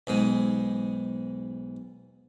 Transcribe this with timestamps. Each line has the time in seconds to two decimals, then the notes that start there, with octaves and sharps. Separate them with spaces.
0.07 B1 G#2 G#3